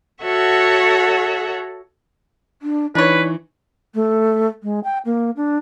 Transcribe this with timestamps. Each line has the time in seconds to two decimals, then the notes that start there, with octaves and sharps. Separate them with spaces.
0.24 F#4 A4 C#5 E5 F#5
2.62 D4
2.95 E3 D4 D#4 B4 C#5
3.95 A3
4.63 G#3
4.84 G5
5.05 A#3
5.37 D4